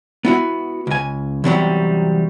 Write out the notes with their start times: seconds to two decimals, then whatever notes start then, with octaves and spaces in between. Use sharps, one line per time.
0.25 B3 E4 F#4
0.87 C#2 G#5
1.44 E2 C3 F#3 G3